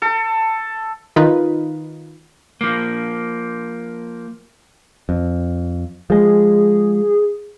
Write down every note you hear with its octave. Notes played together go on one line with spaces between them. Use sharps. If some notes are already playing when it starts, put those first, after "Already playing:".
A4
D#3 D#4 F4 B4
F3 A#3
F2
F3 G#3 G#4